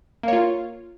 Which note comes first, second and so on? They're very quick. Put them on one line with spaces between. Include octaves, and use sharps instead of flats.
A#3 C#5 F4